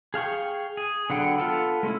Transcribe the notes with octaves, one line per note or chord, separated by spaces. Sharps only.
G#4 F5 G5 C#6
G#4
D3 F#3 B3 F#5 G5
B3 F4 A4 F#5
G#3 A3 C#4 E4